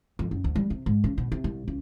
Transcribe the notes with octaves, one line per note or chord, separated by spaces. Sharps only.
F2
F#2
D2
G3
C3
G#2
C#3
B2
C3
C2
C#2